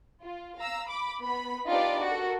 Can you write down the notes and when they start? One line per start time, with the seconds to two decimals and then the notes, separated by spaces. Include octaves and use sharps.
0.21 F4
0.58 F5 A#5 E6
0.87 B5 D6
1.21 B3 B5
1.69 D4 D#4 F4 G4 B4 D5
2.05 F#4 A4 A#4